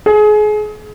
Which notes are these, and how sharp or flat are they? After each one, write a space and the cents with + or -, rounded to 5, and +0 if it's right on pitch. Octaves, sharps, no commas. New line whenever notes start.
G#4 +30